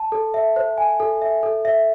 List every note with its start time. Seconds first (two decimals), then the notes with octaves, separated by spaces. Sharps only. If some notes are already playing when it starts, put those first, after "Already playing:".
Already playing: A5
0.12 A4
0.34 E5
0.56 C5
0.78 G#5
1.00 A4
1.22 E5
1.43 A4
1.65 E5